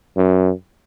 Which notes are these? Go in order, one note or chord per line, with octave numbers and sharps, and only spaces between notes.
F#2